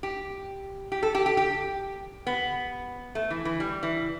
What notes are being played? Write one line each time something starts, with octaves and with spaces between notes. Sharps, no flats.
G4
G4
A4
G4
G4
G4
B3
A3
E3
E3
G3
E3